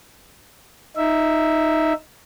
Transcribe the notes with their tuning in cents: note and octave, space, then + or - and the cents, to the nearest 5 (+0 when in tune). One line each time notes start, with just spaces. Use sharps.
D#4 +0 E5 +0